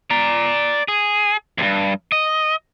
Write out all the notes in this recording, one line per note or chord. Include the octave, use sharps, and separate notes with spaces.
D5 A#5
G#4
D2 G2
D#5